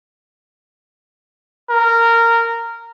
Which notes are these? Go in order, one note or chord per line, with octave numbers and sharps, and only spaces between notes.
A#4